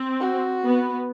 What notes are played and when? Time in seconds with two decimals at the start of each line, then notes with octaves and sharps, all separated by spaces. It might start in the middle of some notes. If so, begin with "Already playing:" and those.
Already playing: C4
0.20 F#4
0.64 B3